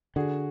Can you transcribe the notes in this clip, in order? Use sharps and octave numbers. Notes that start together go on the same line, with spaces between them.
D3 F#4 G#4